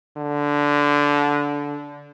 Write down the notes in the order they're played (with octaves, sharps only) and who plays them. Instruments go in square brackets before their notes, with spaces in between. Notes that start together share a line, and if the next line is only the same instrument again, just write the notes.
[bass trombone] D3